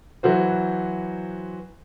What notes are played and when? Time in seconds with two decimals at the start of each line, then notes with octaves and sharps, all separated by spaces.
0.23 E3 F#3 F#4 C5